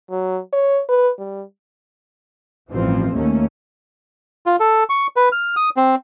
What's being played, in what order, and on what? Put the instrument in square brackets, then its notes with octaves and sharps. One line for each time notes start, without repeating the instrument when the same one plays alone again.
[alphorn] F#3
C#5
B4
G3
[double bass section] A1 G2 E3 F3 C4
D#2 D#3 A3 A#3 C#4
[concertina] F4
A4
C#6
B4
F6
D#6
C4